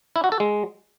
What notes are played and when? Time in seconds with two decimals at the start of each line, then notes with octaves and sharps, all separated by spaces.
0.16 E4
0.24 F#4
0.32 A4
0.40 G#3